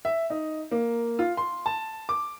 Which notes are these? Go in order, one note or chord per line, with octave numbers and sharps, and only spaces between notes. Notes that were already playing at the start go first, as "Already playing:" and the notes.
E5
D#4
A#3
F4
C6
A5
D6